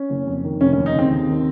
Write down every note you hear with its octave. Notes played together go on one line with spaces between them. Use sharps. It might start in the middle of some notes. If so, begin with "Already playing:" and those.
Already playing: C#4
F#1
F2
D#3
F1 C#4
C#4
D#2
D#4
C#3 C4
D#2
D#3